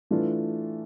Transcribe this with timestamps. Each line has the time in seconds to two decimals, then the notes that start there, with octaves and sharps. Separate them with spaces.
0.11 E3 A3 D4 F4